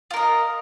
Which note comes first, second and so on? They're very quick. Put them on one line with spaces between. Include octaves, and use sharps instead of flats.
F4 A#4 D#5